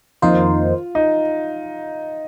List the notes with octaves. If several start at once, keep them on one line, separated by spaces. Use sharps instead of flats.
F2 D#3 A#3 D#4 F4 C5
D#4